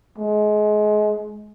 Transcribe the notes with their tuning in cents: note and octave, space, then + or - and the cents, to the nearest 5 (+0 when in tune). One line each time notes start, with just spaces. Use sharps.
G#3 +25